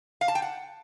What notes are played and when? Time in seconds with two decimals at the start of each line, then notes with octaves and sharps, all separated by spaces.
0.21 F5
0.28 A5
0.35 G5
0.42 F#5